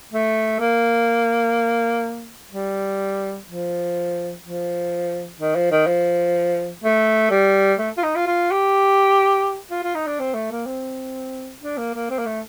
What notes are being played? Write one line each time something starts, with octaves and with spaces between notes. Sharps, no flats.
A3
A#3
G3
F3
F3
D#3
F3
D#3
F3
A3
G3
A3
F4
D#4
F4
F4
G4
F4
F4
D#4
D4
C4
A3
A#3
C4
D4
A#3
A#3
C4
A#3
A3